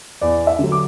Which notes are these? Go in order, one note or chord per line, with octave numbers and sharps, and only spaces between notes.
E2 D5
E5
D3 F#3
D6